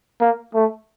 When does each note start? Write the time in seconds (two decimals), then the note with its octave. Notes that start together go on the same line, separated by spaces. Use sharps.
0.21 A#3
0.55 A3